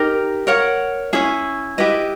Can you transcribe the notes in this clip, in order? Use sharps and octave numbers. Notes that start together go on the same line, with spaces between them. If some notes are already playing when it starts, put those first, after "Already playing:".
Already playing: D#4 G4 A#4
A#4 C#5 F#5
C#4 E4 G#4
E4 G4 B4 D#5